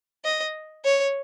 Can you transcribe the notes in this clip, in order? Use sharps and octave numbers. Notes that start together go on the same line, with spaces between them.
D#5
C#5